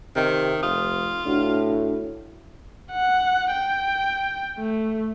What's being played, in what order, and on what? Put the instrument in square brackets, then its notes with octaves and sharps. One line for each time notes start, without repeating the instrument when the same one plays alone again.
[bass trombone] C3 [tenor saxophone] D#3
[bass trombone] F1 [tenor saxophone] F4 [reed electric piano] D#6
[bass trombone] A2 [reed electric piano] D4 F#4
[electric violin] F#5
G5
A3